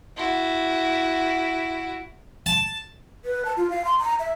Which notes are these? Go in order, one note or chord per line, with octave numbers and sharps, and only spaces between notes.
E4 F#4
A5
B4
A5
F4
F5
C6
A#5
E5